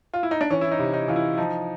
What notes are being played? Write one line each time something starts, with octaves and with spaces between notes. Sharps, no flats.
F4
E4
D#4
D4
E3 C#4
E4
D#4
C3
D#4
E3 F4
E4
F3 D#4